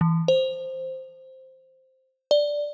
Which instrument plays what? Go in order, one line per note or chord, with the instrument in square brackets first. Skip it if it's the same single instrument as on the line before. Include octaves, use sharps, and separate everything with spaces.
[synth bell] E3
C5
D5